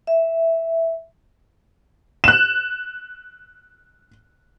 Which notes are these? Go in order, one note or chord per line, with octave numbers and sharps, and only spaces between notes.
E5
F#6 E7